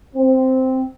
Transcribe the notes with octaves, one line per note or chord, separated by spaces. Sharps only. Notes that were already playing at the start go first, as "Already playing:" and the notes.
C4